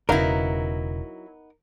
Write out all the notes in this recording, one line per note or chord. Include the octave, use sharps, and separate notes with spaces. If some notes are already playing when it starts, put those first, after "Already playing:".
E1 C#3 F#3 B3 D#4 E4 A#4 F5